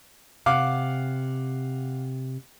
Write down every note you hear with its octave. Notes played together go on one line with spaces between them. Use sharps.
C3 F5 F#5 D6